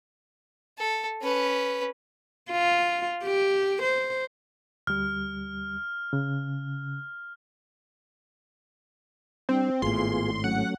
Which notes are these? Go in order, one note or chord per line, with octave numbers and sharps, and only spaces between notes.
A4
C#4 B4
F4
G4
C5
D2 G3 F6
C#3
G3 C4 D4
G#1 A2 B3 F4 G#4 C6
F#3 A3 C#4 F#5